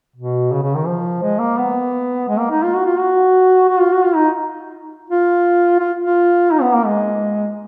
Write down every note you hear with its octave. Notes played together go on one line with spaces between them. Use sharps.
B2
C#3
C#3
D#3
F3
G#3
A#3
B3
G#3
A#3
D#4
F4
F#4
F4
F#4
F#4
F4
F#4
F4
D#4
F4
F4
F4
D#4
B3
A#3
G#3